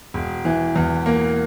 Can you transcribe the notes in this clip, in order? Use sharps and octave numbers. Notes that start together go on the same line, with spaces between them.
E1
E3
E2
A#3